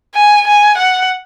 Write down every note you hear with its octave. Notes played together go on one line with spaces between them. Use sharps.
G#5
G#5
F#5